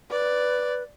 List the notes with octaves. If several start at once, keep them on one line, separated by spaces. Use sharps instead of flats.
B4 D5